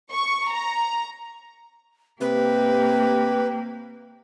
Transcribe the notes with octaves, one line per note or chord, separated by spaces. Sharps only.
C#6
A#5
C3 A#3 G4 B4